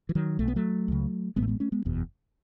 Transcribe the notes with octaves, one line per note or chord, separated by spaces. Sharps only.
E3
D#3 F#3
B1 B2 A3
B3
F#3 A3
C#2 C#3
A1 A2 G#3 A3 B3
G#3 B3
A3 C#4
G#3 B3
F#1 E2 B2